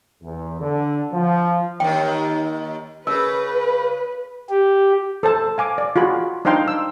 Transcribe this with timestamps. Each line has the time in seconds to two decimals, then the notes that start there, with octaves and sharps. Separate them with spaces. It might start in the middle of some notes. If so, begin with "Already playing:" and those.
0.23 E2
0.60 D3
1.12 F3
1.80 D#2 D#3 G5
3.07 C#3 A#4 B4
4.50 G4
5.23 A4 C5 A5
5.58 F5 G#5 D6
5.78 D5
5.96 F4 F#4 G#4 B5
6.45 D4 D#4 C5 F5 G5 C6
6.68 E6